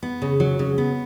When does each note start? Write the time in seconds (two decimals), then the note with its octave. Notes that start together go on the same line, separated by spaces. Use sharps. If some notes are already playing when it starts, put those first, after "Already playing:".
0.03 B3
0.22 C#3
0.40 F#3
0.59 C#3
0.78 B3